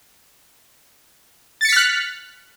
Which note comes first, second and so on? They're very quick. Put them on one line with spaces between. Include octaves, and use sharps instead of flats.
A6 C#7 B6 F6 F#6